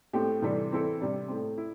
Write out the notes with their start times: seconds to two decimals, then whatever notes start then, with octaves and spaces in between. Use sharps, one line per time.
0.13 A2 A3 C4 G4
0.42 C3 E3 G3 D4 A4
0.71 E3 C4 E4 A4
1.00 C3 G3 D4
1.28 A2 A3 C4
1.58 E4